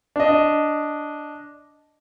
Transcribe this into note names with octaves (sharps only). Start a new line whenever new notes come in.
D4 D#5